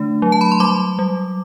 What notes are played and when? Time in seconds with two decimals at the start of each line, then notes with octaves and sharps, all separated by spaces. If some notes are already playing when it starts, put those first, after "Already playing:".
Already playing: D3 A3 D4
0.22 F#3
0.32 A5
0.41 B5
0.52 C6
0.60 G3 D6
0.99 G3